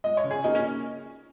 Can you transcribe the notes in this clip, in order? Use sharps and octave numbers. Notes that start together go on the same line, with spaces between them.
G#3 D#5
C#5
C#3
G#4
A#3 D#4
C#4